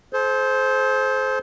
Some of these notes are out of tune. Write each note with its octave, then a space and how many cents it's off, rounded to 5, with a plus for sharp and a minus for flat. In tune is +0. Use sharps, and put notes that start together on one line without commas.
A4 -45 C5 +0